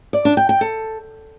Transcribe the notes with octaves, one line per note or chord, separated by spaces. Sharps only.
D5
D4
G5
G5
A4